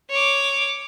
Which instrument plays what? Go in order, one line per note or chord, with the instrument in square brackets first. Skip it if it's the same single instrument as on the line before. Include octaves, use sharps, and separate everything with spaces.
[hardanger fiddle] C#5 D6